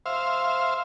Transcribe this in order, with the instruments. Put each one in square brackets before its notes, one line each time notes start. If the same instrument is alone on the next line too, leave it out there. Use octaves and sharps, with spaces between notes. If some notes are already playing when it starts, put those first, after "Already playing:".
[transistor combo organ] C5 E5 F5